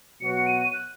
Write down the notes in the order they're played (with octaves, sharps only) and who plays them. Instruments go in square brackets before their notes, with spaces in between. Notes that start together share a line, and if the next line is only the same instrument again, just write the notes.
[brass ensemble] B2 F#3 B3 F#4 [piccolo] C#7
[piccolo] C#7
D#7
D#7
F#6